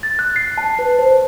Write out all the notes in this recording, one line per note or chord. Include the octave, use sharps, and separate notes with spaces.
A6
F#6
C7
A5
B4
C5